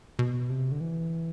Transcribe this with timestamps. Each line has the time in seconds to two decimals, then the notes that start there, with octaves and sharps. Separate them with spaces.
0.19 B2
0.50 C3
0.71 D3
0.81 E3